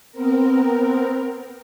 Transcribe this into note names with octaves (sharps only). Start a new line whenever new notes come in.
B3 C4 A#4